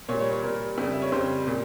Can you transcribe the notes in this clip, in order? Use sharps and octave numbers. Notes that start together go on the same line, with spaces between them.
A#2 G3 C#5
C#5
C#5
A#2 G3 A#4
F2 C#3 G3
E5
C#5
F2 C#3 G3 C5
A#2 G3